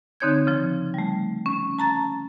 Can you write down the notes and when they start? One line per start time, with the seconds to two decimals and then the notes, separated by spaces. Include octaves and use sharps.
0.20 D3 C4 D#4 C#5 G6 G#6
0.47 C#3 F3
0.94 G3 A3
1.46 C#4
1.79 A5 A#5 A6